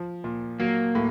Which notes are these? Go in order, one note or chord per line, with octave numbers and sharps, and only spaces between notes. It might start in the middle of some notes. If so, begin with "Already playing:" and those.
Already playing: F3
A#2
F#3 A#3
A2